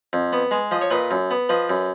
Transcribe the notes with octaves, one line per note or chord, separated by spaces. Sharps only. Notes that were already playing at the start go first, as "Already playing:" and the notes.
F2
B3
G#3
F3 D#5
C#5
A#2 B4 D#5
F#2
B3
F3 B4 D#5
F#2